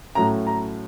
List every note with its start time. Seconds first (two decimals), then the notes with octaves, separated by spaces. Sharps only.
0.15 A2 F#3 A3 C#4 A#5
0.47 A#5